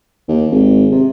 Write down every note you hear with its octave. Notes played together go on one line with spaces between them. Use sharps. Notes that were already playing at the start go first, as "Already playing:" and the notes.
D#2
G#1
C3